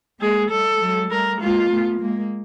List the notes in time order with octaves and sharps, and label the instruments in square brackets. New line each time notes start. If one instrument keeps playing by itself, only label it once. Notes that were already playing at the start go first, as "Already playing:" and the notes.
[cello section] G#3 A#3 [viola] G#4
[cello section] G3 A3 [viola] A4
[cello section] F#3 G#3
[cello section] G3 A3 [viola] A#4
[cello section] G#3 A#3 [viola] F4
[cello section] A3 B3
G#3 A#3